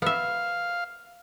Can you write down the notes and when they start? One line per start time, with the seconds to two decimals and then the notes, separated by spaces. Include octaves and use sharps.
0.02 B3 E5 F5